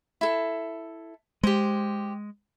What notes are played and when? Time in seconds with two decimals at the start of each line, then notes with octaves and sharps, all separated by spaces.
0.21 E4 A4
1.43 G#3 G4 C5